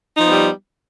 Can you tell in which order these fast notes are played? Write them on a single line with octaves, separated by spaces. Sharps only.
D#4 F3 B3 G3